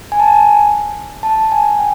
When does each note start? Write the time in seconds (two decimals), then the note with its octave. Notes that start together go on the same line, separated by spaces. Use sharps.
0.12 G#5
0.20 A5
0.28 G#5
1.23 A5
1.52 G#5
1.79 G5